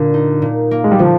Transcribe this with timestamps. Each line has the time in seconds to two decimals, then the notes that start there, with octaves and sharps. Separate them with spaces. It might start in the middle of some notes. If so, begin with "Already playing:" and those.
Already playing: A#2 D3
0.14 D#4
0.42 A#2
0.71 A#3
0.84 G#3
0.92 G3
0.99 D3 F3